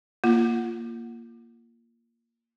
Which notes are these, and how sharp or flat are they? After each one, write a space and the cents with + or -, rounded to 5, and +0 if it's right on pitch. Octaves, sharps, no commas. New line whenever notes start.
A#3 +0 F4 -15